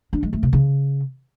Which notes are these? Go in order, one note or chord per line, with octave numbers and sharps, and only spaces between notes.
D4
G#3
A3
C3
C#3